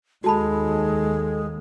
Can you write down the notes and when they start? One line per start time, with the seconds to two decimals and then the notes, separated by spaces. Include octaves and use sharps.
0.24 D#2 G#3 F#4 A4 A5 B5